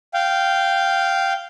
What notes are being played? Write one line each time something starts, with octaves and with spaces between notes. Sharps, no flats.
F5 G5